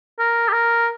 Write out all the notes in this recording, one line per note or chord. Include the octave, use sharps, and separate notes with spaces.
A#4
G4
A#4